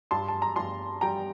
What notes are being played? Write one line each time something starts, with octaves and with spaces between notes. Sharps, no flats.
G2 A5 C6
A5
A#5
G2 A5 C6
G3 G5 A#5